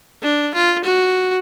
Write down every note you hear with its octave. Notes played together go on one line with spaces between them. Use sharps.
D4
F4
F#4